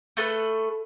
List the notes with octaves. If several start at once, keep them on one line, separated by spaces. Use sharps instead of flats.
A3 A4 B4 F#6